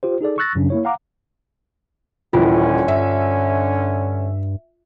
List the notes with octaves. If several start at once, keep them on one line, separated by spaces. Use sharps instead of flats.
F4 G4 C5
D#4 G#4 A4 D5
C#6 E6 F#6 A6 A#6
F#2 C#3 F#3 C#4 D4
A#3 E4 C#5
F5 F#5 A#5 D6
D#1 D3 E3 C#4 E4 F4
G2 E5